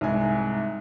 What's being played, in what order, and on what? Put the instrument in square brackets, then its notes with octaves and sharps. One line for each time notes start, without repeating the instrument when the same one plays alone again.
[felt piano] C2 G#2 G#5